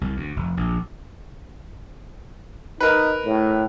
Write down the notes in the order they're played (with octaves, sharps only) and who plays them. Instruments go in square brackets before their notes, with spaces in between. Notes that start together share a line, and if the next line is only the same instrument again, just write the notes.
[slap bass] C2
D2
F1
A#1
[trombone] D#4 [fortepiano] A#4 B4
[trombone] A2